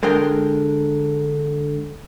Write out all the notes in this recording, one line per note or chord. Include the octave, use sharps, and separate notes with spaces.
D3 G#3 G#4 A#4 G5